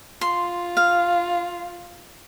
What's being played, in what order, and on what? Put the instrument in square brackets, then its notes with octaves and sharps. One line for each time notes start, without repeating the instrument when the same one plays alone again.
[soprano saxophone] F4 [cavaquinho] C6
[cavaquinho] F5